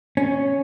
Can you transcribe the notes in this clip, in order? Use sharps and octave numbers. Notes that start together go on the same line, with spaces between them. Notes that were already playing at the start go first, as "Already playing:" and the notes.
C#4